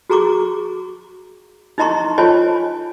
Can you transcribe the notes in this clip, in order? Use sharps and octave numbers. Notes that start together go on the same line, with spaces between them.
F#4 G#4 A#5 C#6 D6
D#4 E4 D#5 A#5 C6 C#6
F4 C5 C#5 D#5 G#5 A5